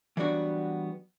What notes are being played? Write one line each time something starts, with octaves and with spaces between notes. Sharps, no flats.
E3 F#3 G3 B3 D4 F#4